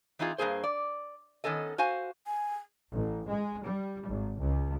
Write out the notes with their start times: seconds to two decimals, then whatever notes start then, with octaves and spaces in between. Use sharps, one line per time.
0.19 E3 C4 D#4 F4 G#4
0.38 G2 F3 A#3 G#4 C5
0.64 D5
1.44 D#3 B3 C#4 A4 D#5
1.78 F#4 C5 F5 G#5
2.27 G#5
2.92 A1
3.29 G#3
3.65 G3
4.09 G#1
4.41 C#2